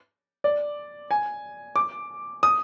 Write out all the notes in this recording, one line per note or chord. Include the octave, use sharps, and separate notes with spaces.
D5
G#5
D6
D#6